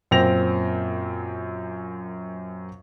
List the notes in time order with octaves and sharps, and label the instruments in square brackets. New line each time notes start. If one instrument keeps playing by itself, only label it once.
[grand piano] F#2 A#2 C4 G5 A#6 F7